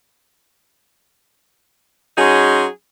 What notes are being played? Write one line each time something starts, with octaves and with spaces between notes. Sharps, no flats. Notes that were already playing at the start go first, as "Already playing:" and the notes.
F#3 C#4 D#4 G#4 C6